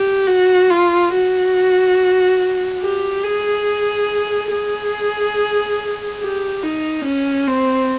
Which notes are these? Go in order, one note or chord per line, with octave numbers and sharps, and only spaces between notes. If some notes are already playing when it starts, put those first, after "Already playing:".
Already playing: G4
F#4
F4
F#4
G4
G#4
G#4
G4
D#4
C#4
C4